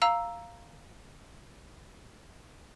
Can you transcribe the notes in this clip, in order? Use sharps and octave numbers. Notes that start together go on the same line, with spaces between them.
F5 A#5 E6